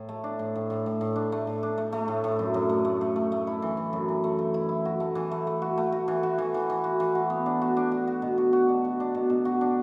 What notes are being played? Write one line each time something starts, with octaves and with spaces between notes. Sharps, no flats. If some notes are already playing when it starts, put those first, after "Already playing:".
Already playing: A2
A3
D4
A2
A2
A2
A2
A2
D4
A3
A2
D4
A3
A3
A2
A2
F#2
F#2
A3
A3
A3
A3
A3
E4
E3
E3
F#2
E3
A3
A3
E4
E4
F#4
A3
E3
A3
A3
F#4
A3
F#4
E3
F#4
E3
E3
E3
F#4
E3
F#4
B3
D4
F#4
D4
F#4
F#4
B2
F#4
F#4
D4
F#4
D4
B2
B2
F#4
D4